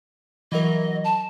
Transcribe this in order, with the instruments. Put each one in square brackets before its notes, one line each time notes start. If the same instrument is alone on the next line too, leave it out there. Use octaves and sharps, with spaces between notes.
[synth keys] E3 F#3 A#4 [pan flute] D#5
[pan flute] A5